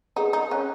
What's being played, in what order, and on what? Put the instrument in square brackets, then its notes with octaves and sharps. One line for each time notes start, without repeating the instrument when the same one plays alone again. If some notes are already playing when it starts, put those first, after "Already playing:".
[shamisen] D#4 [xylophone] G#4 B4 F#5
[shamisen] D#4
[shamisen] C#4 [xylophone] F#5 C#6 F#6